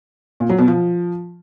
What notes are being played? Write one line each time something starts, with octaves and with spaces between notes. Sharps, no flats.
A#2
F#3
B2
F3